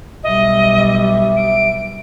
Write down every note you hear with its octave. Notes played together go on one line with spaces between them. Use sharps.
B1 G3 D#5 E5
D7